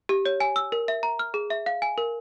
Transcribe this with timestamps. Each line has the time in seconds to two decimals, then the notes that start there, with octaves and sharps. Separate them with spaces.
0.09 G4
0.25 C#5
0.40 G#5
0.56 E6
0.72 A#4
0.88 E5
1.03 A#5
1.19 F6
1.34 G#4
1.50 E5
1.66 F5
1.82 G#5
1.98 A#4